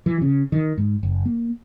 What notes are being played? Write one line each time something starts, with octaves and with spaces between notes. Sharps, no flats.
E3
C#3
D#3
G#2
F#1
A#3